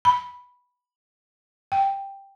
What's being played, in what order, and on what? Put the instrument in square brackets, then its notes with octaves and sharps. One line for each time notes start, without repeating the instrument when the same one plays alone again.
[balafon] B5
G5